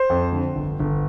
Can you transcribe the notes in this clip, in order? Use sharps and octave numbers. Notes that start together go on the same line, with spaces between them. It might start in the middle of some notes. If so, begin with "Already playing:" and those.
Already playing: C5
F2
D3
G1
G1